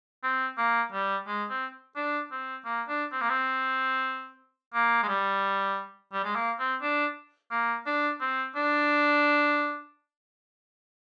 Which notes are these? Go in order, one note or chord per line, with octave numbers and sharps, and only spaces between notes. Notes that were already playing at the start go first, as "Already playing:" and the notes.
C4
A#3
G3
G#3
C4
D4
C4
A#3
D4
C4
A#3
C4
A#3
G#3
G3
G3
G#3
A#3
C4
D4
A#3
D4
C4
D4